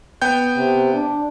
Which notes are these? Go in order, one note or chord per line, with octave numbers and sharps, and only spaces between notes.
B3 G5 G6
C3
D4